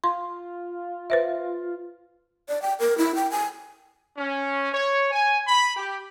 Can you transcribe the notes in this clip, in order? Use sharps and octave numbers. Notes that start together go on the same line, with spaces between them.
F4 C6
B4 C5 E5
D5
G5
A#4
E4
G5
G#5
C#4
C#5
G#5
B5
G4